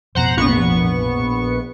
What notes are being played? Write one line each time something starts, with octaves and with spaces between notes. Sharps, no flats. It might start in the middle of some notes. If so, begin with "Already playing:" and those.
A1 F2 B2 C5 F#5 A#5
A#1 B3 C#6